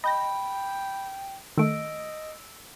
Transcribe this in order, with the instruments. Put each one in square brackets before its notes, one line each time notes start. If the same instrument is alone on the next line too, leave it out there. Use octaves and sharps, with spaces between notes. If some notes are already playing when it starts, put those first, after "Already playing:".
[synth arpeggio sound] D#5 G6 A#6 [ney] G5 [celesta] B5
[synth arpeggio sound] D#3 A3 [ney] D#5 [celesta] E6 D7